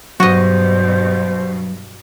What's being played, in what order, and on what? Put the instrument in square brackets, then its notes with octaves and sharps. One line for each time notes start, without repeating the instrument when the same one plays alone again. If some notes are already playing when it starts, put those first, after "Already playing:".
[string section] G2 B2 [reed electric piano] F#3 [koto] F#4 D#5 [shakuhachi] C5